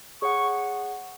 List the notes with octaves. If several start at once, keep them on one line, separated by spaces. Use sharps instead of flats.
G#4 C#5 F#5 C#6